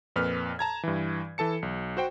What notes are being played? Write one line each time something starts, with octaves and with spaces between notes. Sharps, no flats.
F2 A#2 B4 F6
A5 A#5 G#6
G2 E3
E3 A4 A5 C#7
B1
F#4 C5 G5